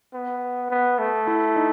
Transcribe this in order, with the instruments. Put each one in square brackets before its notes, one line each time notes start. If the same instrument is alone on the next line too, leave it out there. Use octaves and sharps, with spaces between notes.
[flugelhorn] B3
B3
A3
[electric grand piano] E4
D#4